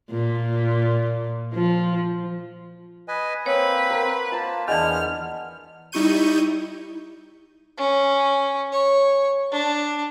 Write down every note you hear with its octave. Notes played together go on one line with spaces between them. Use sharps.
A#2
F3
B4 D#5 G#5
A#3 C4 B4 C#5
A#4 C5 F#5
A#3 F4 C5 A5 A#5
E2 E3 G#3 B3 D4 F#5 F6
G3 D#4 E4 C#6 G6 D#7
C#4
C#5
D4